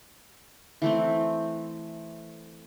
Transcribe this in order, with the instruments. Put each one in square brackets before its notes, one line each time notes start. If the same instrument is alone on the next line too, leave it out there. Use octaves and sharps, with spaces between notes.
[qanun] E3 A3 C4